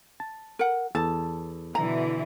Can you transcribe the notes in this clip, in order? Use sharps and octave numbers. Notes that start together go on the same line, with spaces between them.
A5
A#4 F#5
E2 A4 A5
B2 D3 E3 A#5